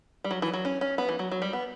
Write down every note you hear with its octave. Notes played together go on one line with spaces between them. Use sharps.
G3
F#3
E3
F#3
C#4
C#4
B3
E3
F#3
F#3
G3
B3